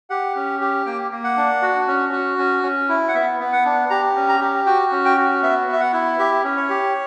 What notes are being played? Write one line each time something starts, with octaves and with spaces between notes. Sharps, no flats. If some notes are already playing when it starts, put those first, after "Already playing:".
G4 F#5
C#4
G4
A#3 G5
A#3
F#5
D4
F#4
C#4
F#4
C#4
C#4
E4
F#5
B3 E5
B3
F#5
D4
G4 A#5
C#4
A#5
G4
F#4 G5
C#4
G5
F#4
B3 E5
B3
E5
F#5
E4
G4 E5
C#4
C#5
G4